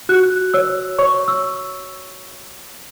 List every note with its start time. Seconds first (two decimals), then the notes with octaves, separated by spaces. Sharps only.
0.09 F#4 F#6
0.54 C#5 E6
0.98 C#5 C#6
1.28 E6